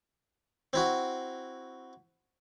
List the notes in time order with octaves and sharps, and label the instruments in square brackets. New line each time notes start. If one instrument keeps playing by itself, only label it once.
[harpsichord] C4 E4 F#4